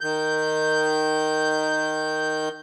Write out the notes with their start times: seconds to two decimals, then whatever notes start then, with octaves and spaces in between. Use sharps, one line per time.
0.01 D#3 G6